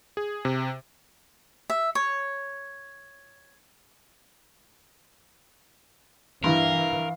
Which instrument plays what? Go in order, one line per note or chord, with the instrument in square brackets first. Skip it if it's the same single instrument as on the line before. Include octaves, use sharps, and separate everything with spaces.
[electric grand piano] G#4
C3
[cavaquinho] E5
C#5
[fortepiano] G2 [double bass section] E3 [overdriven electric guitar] A#4 [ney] F5